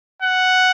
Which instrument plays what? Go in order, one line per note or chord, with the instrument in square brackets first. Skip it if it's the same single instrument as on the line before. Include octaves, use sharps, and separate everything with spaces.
[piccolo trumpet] F#5